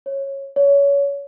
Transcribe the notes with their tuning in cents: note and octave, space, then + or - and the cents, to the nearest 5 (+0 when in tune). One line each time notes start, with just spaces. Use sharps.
C#5 -15
C#5 +25